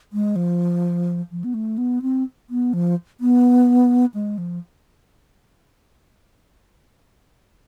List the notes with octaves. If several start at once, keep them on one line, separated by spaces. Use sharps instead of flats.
G#3
F3
F3
B3
A3
B3
C4
B3
F3
B3
G#3
F3